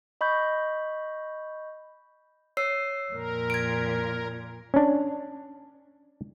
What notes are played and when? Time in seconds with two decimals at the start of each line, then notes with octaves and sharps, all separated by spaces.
0.21 D#5 B5 C#6 G6
2.57 C#5 E6 C7
3.13 F2 A#2 A#4
3.50 G#6 D7
4.74 C#4 D4